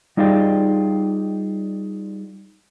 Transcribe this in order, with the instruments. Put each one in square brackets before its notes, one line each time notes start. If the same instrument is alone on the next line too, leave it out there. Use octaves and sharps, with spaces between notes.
[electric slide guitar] G3 D#4 F4 G#4 D5 G5